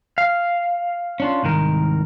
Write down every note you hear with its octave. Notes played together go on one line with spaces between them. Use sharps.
F5
C#4 D4 F4
C2 G#2 D#3 A#4